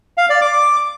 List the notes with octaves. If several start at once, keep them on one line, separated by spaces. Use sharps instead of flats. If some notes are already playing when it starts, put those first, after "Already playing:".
F5
D5
D6